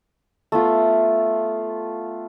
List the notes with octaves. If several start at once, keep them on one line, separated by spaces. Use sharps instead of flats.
A3 B3 F4